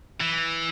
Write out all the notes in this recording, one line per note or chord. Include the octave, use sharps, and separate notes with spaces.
E3